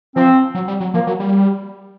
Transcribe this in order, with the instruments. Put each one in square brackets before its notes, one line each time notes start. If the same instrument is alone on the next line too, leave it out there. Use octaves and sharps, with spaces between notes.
[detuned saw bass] F3 [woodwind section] C4
[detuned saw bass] F#3
G3
F#3
[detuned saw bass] F3 [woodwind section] A#3
[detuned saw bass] F#3
G3